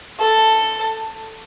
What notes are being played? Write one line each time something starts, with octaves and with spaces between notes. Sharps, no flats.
A4